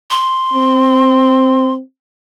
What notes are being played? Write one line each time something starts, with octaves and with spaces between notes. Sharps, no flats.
C6
C4